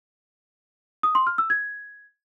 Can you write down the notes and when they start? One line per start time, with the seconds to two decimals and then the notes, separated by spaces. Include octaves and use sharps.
1.03 D#6
1.15 C6
1.27 F6
1.38 E6
1.50 G#6